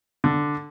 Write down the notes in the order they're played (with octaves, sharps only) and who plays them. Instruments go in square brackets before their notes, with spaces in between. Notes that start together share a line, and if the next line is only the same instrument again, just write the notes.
[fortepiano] D3